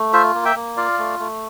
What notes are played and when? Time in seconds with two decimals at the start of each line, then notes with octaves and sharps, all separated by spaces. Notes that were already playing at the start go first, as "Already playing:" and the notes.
Already playing: A3
0.13 F4 C5 E5
0.35 A#3
0.45 E5 G5
0.56 A#3
0.77 F4 D5 F5
0.99 A3
1.20 A3